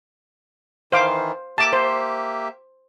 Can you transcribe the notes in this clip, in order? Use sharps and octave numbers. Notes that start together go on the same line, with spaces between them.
D#3 E3 C5 F5 D6
A#3 G4 E5 A5 D6
C5